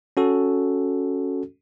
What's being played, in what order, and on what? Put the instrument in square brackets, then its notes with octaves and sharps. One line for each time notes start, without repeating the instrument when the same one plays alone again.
[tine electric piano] C#4 F#4 A4